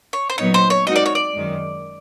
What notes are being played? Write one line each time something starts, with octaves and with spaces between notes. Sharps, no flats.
C#5
C5
A#2 F#3 B3 D#4 C#5
C5
C#5
G#3 C4 D#4 F#4 A#4 D#5
D5
C#5
D5
F#2 D#3 G#3